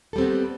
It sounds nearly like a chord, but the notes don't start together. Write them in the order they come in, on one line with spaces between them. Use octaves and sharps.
A4 G3 C4 B3